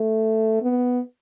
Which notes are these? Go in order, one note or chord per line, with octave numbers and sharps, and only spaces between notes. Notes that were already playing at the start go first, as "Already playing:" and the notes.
Already playing: A3
B3